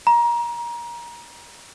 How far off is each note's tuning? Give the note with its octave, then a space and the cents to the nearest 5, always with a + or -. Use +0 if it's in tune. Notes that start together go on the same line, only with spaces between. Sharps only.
A#5 +25